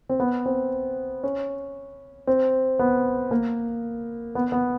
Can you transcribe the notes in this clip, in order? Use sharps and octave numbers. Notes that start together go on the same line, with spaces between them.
C4
B3
C4
C#4
C4
B3
A#3
B3
B3